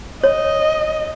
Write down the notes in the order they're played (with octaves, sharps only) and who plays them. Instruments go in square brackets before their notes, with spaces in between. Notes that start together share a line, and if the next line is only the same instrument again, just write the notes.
[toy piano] C#5 [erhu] D#5